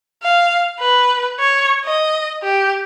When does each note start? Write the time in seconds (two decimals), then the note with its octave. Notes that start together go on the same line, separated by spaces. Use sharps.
0.22 F5
0.80 B4
1.40 C#5
1.84 D#5
2.43 G4